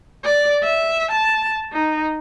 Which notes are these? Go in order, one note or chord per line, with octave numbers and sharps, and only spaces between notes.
D5
E5
A5
D#4